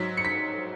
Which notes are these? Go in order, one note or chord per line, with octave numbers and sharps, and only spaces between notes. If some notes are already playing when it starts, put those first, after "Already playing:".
Already playing: G#2 F#3 B6
C#7
B6